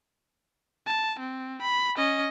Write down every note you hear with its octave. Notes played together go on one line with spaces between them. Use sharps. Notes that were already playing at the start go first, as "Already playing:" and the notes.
A5
C4
B5
C#4 D#5